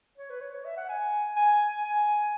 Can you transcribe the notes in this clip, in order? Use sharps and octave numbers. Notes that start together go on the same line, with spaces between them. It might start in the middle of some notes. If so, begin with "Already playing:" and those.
C#5
B4
C#5
C#5
E5
F#5
G#5
G#5
G#5